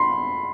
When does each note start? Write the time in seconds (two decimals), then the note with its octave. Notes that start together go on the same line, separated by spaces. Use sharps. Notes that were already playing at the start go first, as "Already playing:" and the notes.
Already playing: B5 C6